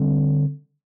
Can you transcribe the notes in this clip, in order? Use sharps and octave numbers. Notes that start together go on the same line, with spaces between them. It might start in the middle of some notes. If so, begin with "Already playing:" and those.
Already playing: D3 G3 C4